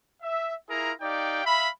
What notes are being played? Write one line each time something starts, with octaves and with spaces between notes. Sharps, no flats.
E5
E4 F4 G#4 A#4 A#5
D#4 G4 D5 F5 G5
E5 F5 B5